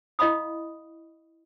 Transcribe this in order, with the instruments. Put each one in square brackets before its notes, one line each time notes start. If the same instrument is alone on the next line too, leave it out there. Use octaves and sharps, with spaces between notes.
[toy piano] E4 D#5 F5 B5 D#6